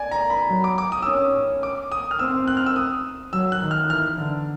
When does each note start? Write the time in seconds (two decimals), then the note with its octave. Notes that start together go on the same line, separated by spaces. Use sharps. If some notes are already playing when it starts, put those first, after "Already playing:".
Already playing: D5 G#5
0.11 A#5
0.30 B5
0.50 F#3
0.64 D6
0.78 D6
0.92 D#6
1.02 E6
1.06 C#4 D#6
1.63 D6
1.92 D#6
2.11 F6
2.19 C4 E6
2.48 F#6
2.57 F6
2.66 E6
2.76 D#6
3.33 F#3 E6
3.52 F#6
3.61 D#3
3.71 F6
3.89 E3 F6
4.17 D3